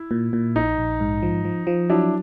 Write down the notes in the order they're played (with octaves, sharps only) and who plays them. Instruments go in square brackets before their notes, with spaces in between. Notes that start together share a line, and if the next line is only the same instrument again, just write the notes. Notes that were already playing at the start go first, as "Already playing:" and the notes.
Already playing: [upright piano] E4
[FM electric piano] A#2
A#2
[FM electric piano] A#1 [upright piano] D#4
[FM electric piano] A#1
G#2
F3
F3
F3
[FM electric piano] F#3 [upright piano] D4 E4